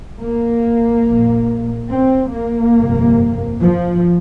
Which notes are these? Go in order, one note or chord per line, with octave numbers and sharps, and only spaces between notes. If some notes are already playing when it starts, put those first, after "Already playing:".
A#3
A#1 A#2
C4
A#3
G1 F2 C3
F3